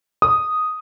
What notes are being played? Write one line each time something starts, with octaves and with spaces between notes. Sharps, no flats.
D#6